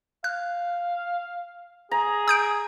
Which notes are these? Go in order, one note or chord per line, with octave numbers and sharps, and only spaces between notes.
F5 F#6
G#4 A#5
D#6 G6 D7